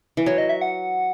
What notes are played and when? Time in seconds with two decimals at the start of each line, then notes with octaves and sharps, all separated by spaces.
0.17 E3
0.26 F#3 C#5
0.38 D#5
0.49 E5
0.61 F#5